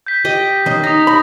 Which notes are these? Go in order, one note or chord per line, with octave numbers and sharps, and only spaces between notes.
G6 B6
G4 D#5
D#3 C#4 D#5
D#4 D#6 A#6
B5